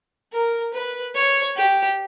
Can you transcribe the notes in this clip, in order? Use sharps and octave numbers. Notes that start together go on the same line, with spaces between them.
A#4
B4
C#5
G4